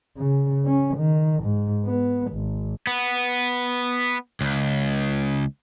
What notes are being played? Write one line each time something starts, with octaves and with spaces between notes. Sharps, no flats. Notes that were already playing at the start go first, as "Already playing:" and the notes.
C#3
C#4
D#3
G#2
B3
G#1
B3
C#2